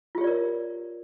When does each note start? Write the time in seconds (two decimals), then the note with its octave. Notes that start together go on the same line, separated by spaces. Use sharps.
0.15 F4
0.18 G4
0.21 C#5
0.24 D5
0.27 A#4